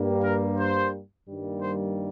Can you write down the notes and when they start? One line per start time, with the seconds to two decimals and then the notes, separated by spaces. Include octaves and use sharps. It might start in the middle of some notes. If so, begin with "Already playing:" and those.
Already playing: G2 G3 A#3
0.24 A#4
0.58 C5
1.27 G2 D#3 G3 A#3
1.61 C5